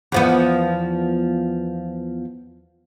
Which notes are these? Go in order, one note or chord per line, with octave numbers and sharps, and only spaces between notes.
E2 F3 B3